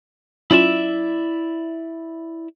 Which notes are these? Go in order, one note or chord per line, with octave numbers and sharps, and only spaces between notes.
F#3 C#4 E4 F4 D5 E5